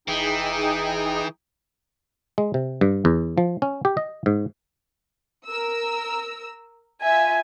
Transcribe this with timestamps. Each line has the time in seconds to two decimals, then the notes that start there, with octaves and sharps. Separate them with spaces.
0.08 F1 E3 D#4 G#4 G5
2.38 G#3
2.54 C3
2.81 G2
3.05 E2
3.38 F3
3.62 C#4
3.85 G4
3.97 D#5
4.26 G#2
5.47 A#4 E6
7.02 F4 E5 G#5